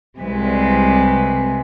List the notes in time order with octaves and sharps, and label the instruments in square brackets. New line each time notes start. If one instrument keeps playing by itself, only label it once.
[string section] C2 [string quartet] C3 G#3 B4